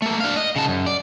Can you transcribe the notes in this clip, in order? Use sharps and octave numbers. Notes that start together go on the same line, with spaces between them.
A3 A#3
D4 F5
D#5
C#3 A5
F#2
D5